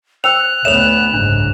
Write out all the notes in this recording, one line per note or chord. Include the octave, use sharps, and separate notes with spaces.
C5 G5 E6 F#6 F7
D2 B3 A4 C#5 E5 E7 F7
F#1 C2 G#2 D4